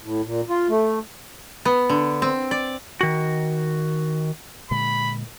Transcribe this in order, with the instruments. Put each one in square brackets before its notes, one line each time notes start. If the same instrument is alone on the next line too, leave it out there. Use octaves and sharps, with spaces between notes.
[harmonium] A2
A#2
F4
A3
[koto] B3
D3
C4
D5
[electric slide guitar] D#3 F#4
[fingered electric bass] A#2 D3 G#3 [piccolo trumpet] B5